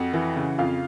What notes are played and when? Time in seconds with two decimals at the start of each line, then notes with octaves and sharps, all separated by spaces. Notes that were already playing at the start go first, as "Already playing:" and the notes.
Already playing: F2 F#4 F#5
0.13 E3
0.36 C#3
0.58 F2 F4 F5